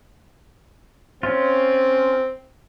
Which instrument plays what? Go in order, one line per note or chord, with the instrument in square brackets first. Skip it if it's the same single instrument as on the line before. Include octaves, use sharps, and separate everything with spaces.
[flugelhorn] C4 [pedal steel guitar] C#4 F4